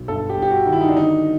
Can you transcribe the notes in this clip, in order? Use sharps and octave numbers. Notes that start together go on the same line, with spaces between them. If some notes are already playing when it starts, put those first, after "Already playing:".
Already playing: B1
G1 A4
G4
G1
G4
F#4
D#3
E4
D#4
D4
D3 D#4